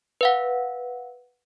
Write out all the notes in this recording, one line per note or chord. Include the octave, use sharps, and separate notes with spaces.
B4 F5 F#5